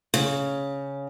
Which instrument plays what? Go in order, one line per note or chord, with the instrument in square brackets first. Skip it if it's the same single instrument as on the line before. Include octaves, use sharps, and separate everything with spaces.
[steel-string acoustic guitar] C#3